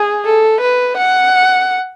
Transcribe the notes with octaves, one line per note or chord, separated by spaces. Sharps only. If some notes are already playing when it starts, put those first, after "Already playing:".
Already playing: G#4
A4
B4
F#5